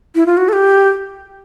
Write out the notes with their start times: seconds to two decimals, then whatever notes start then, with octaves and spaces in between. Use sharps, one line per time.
0.15 E4
0.26 F4
0.37 F#4
0.49 A4
0.53 G4